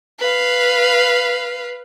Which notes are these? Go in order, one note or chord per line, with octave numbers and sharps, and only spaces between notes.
B4 F5